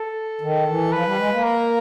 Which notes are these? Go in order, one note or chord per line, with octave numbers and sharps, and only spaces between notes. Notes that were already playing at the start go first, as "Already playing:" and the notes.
Already playing: A4
D#3
E3
F3 B4
G3
G#3
A#3
A#4